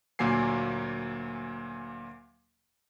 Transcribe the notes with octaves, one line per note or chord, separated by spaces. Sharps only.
D2 A#2 F#3 A#3 G#5 C7